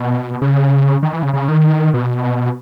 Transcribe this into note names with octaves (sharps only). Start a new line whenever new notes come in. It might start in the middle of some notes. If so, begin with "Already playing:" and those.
Already playing: B2
C#3
D#3
E3
C#3
C#3
D#3
B2